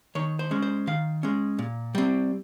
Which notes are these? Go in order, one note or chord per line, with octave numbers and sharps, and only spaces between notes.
D#3 C#5
C5
G#3 C#4
C5
D#3 F5
G#3 C#4
A#2
G3 C4